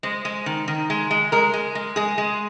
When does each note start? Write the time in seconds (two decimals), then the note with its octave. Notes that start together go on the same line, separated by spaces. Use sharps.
0.03 G#3 C5
0.25 G#3
0.46 D#3
0.68 D#3
0.90 G#3
1.11 G#3
1.32 G#3 A#4
1.54 G#3
1.75 G#3
1.96 G#3 G#4
2.18 G#3